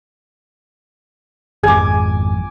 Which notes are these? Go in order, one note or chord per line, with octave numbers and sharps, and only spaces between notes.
G#1 F2 G#4 G#5 D6